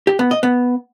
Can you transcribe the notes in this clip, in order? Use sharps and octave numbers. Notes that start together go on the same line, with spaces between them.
G4
B3
D#5
B3